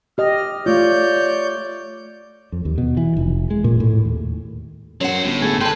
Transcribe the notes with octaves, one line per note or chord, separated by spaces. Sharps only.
G4 D#5 F6
A3 F4 C#5 D5 G6
F2
D#2
B2
E3
F1
G#3
A#2
A2
D#2
F#2 F#3 C5 C#5 F#5
G1 A2
A3 G#4
D3 B4 G5 A5 C6